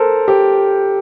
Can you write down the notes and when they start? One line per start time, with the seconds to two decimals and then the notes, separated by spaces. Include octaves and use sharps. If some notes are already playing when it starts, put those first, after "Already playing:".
Already playing: A4 A#4 C5
0.28 G4